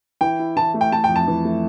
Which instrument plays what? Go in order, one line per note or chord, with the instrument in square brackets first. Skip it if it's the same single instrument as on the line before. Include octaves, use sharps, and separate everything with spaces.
[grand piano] E3 [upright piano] G5
[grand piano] E4
[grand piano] E3 [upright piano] A5
[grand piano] A3
[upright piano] G5
[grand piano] A3 [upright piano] A5
[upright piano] G5
[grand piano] F2
[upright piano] A5
[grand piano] E3
A3